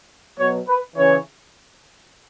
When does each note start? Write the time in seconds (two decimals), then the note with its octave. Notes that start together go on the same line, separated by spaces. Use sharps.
0.39 B2 F#3 C#5
0.68 B4
0.96 C#3 E3 C#5